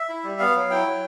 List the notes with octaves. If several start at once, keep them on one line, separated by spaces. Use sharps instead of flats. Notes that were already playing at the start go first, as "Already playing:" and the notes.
Already playing: E5
E4
G3
B3 F5
F#3
E4 G5
F#3